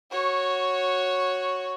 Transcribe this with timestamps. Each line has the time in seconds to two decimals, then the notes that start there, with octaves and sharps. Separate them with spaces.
0.11 F#4 C#5